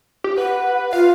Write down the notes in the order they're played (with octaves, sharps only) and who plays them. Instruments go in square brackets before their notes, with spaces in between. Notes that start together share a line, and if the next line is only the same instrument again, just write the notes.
[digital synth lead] G4
[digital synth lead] B4 [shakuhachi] F#5
[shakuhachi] F4 [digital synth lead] F5